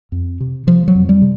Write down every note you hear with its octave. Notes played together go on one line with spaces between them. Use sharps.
F2
C3
C3 F3
F#3
F2
G3
C3